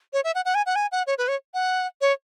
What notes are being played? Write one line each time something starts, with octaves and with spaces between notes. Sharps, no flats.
C#5
E5
F#5
F#5
G#5
F#5
G#5
F#5
C#5
B4
C#5
F#5
C#5